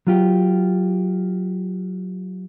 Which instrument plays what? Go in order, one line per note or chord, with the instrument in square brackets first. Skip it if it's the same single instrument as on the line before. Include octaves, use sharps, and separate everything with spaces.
[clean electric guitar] F#3 F4 G4